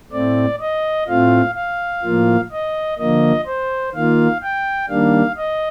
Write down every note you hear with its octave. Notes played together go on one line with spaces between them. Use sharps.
A2 A3 C4 D5
D#5
A2 A3 C4 F4 F5
F5
A2 F3 A#3 F4
D#5
D3 F3 A#3 D#5
C5
D#3 A#3 F4 F5
G5
D#3 G3 A#3 D4 F5
D#5